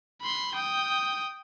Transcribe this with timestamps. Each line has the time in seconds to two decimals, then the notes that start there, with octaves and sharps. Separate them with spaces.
0.22 B5 C6
0.55 G5 D#6